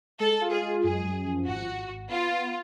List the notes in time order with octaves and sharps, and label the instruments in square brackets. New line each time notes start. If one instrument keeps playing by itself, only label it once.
[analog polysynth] G#3 [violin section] A4
[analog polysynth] F4
[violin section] G#4
[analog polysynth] G#3
[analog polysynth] F#2 [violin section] G#4
[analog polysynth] F#2
F3
[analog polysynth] G#1 [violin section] F#4
[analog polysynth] G#1
G#1
[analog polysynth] B3 [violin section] F4
[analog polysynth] B3